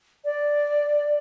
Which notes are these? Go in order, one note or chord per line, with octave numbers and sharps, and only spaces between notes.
D5